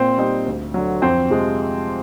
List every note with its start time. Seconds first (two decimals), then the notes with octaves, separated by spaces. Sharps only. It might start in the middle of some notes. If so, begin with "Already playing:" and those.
Already playing: A#2 C4 C5
0.17 G3 C4 D#4
0.46 D2
0.74 D3 F#3
1.02 F2 C4 C5
1.29 C3 F3 G#3